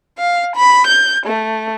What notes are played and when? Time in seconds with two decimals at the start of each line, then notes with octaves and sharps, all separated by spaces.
0.19 F5
0.56 B5
0.88 G6
1.27 A3